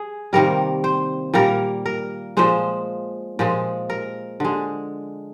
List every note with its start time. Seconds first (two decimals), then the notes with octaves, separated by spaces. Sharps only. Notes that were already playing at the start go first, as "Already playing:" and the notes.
Already playing: G#4
0.33 C3 D#3 G3 A#3 A#4
0.84 C5
1.34 A#2 G3 A#3 A#4
1.86 A#4
2.37 A#2 F3 G#3 C5
3.39 A#2 F3 G#3
3.90 A#4
4.40 D3 G#3